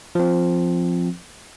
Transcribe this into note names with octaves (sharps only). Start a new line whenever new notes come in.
F3 C4